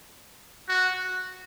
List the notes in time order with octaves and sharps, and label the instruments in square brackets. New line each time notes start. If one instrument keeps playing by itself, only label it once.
[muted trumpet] F#4